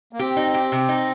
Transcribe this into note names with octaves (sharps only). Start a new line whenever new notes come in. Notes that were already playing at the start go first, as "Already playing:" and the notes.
A#3
C4 G4
D#4
G4
C3
D#4